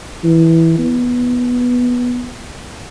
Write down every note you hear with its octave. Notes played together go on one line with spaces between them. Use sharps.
E3
B3